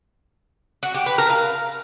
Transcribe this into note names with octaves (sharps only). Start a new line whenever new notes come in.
F#4
G4
B4
A#4
F5